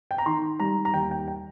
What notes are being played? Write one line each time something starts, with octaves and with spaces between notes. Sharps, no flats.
G5
A#5
D#3 C6
G3 A#5
A#5
D#2 G5
G5
G5